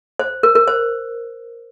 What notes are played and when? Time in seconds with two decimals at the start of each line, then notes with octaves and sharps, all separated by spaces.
0.19 C5
0.43 A#4
0.55 A#4
0.68 C5